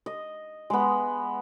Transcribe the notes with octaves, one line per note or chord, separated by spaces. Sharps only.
D#5
G#3 B3